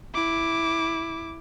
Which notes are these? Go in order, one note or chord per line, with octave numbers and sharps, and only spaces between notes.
E4 D6